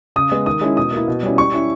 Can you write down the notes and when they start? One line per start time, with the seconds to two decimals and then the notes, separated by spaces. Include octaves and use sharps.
0.16 C#3 D#6
0.32 G#3 B3
0.46 D#3 D#6
0.61 G#3 C#4 E4
0.77 B2 D#6
0.92 A#3 E4
1.08 B2
1.23 G3 C#4 E4
1.38 G3 C#6
1.53 C#4 E4